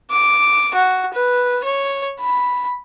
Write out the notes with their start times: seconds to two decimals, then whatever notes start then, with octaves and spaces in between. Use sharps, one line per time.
0.11 D6
0.74 F#4
1.14 B4
1.64 C#5
2.20 B5